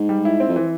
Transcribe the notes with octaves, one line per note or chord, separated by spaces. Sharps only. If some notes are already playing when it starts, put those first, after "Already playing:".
Already playing: G#2
G3
E4
C4
F2
E3